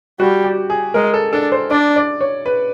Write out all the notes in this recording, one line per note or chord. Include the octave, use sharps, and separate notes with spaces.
G3 F#4
G4
G#4
G#3 A#4
A4
D4 A4
C5
D4 D5
D5
C#5
B4